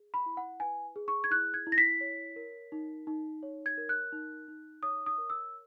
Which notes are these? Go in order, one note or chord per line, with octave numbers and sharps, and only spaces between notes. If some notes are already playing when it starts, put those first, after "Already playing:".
Already playing: G#4
B5
E4
F#5
B4 G#5
G#4
C#6
G#6
E4 F#6
G#6
E4
A#6
B6
C#5
A#4
D#4
D#4
C#5
G#6
A#4
F#6
D#4
D#4
C#5 D#6
D#6
A#4
E6